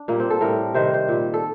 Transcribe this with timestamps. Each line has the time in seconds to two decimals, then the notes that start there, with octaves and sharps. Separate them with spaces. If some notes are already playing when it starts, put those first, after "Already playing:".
Already playing: D4
0.08 A#2 G3 A#3
0.20 C4
0.30 A4
0.41 A2 G3 A#4
0.74 C3 D#3 G3 C5
0.94 C5
1.08 A#2 G3
1.34 A4